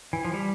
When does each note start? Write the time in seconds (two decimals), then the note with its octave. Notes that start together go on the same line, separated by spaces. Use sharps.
0.13 E3
0.25 F3
0.34 G3